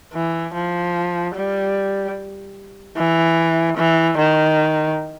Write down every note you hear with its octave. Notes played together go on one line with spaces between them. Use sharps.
E3
F3
G3
E3
E3
D#3